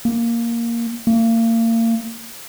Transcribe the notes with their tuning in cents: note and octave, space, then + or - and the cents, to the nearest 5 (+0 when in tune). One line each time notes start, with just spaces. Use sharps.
A#3 +0
A#3 -35